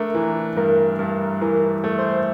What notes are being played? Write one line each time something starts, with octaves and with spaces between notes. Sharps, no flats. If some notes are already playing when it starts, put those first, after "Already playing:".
Already playing: A3 D4 A#4
E3
G2 A#4
G2 A#4
E3 A#4
A3
C5